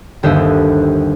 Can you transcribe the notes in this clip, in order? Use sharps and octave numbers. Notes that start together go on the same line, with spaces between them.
G1 D#2 C5 D#5 E5